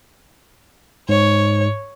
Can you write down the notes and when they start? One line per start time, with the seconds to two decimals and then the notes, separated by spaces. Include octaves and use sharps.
1.09 G#2 C#5